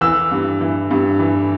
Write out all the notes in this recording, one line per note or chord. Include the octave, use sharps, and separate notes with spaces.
E3 E6
G2
E3
G2
E3